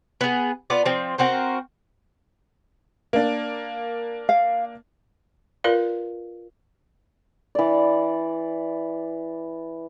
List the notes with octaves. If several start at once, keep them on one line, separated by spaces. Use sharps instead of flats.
B3 G#4
B3 F4 D5
F3 C4
C4 F#4 A#4 C5
A#3 D4
F5
F4 A#4 B4 D5 F5
E3 D5